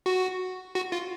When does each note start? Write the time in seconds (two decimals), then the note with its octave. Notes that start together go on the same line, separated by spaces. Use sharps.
0.06 F#4
0.75 F#4
0.92 F4